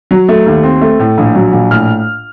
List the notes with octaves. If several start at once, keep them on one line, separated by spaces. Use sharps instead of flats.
F#3
A3
D#2
C4
A3
A2
A#1
F#3
A#1
A2 F6